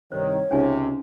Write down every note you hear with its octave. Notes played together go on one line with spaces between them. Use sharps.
C2 G2 D#3 C5 C#5
C#2 C3 C#4 D#4 G#5